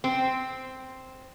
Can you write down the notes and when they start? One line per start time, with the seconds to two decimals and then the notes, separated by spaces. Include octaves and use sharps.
0.04 C4